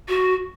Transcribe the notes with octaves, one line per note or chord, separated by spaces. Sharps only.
F#4